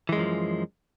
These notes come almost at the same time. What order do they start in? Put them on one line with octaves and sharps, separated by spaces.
E3 G#3 F#2 F3